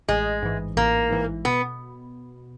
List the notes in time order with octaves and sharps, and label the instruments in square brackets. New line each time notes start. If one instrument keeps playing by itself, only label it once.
[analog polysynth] A1 [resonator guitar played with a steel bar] G#3
[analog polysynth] G#2 E3
[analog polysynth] A1 [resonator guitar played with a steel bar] A#3
[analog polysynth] G#2 E3
[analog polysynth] B2 [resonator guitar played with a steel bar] B3